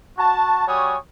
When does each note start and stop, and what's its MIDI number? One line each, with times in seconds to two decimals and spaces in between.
0.18 0.64 66
0.18 0.64 81
0.67 0.96 55
0.67 0.96 66
0.67 0.96 73
0.67 0.96 80
0.67 0.96 87